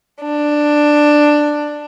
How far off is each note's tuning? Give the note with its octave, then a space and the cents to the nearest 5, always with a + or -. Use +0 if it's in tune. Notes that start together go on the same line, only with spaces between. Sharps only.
D4 +10